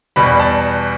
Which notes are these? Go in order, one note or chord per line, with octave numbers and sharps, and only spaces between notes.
E2 B2 G3 B5
A5